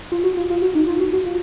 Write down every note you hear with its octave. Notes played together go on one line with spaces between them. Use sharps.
F4
F#4
F4
F4
F#4
D#4
F4
F#4
F#4
F4